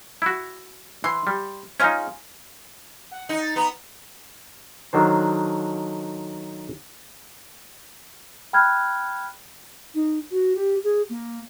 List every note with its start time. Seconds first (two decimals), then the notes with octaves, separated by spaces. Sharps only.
0.22 E4 F#4
1.04 E3 C6
1.27 G3
1.80 G#3 C#4 D#4 F4 G#4
3.11 F#5
3.29 D#4
3.41 A6
3.56 B3 A#5
4.93 D3 D#3 F#3 D4 C5
8.53 G5 B5 F6 F#6 G#6
9.94 D#4
10.31 F#4
10.56 G4
10.84 G#4
11.09 A#3